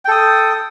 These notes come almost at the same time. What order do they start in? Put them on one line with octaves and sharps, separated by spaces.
G5 A4 D#6